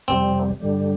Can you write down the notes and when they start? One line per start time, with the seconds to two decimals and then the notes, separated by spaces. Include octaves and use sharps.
0.08 F2 C3 G3 C4
0.60 G2 D3 G3